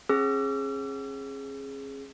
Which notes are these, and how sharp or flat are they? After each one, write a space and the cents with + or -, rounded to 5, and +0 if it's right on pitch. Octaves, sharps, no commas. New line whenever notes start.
C#4 -40 G#4 +0 E6 +45